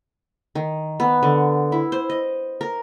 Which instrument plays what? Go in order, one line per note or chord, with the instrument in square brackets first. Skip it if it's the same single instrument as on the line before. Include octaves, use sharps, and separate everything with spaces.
[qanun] D#3
B3
D3
E4
C5
D#5
A#4